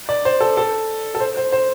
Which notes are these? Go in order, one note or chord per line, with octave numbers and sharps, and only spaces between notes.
D5
C5
A4
A4
A4
C5
C5
C5